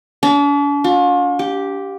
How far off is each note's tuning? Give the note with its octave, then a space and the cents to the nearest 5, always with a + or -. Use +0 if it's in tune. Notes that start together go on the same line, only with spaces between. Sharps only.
D4 -45
F4 +40
G4 -5